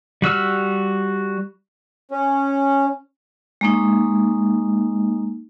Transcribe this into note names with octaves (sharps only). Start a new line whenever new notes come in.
G3 F#4 E6 F6
C#4
G#3 A#3 D#4